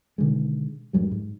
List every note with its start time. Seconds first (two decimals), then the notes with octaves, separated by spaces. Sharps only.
0.18 B2 D3 D#3 G#3
0.93 F2 G#2 F#3 G3
1.12 G#2